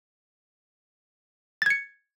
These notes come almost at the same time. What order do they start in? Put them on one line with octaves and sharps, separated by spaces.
A6 G#6 C#7